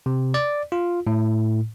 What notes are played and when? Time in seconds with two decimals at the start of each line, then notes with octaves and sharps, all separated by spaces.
0.06 C3
0.34 D5
0.72 F4
1.07 A2